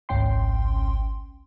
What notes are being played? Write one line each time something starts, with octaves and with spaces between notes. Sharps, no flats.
G#1 C#2 C#4 G5 C6